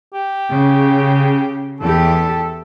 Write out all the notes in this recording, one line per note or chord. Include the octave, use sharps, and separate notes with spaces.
G4
C#3
E2 G4 A4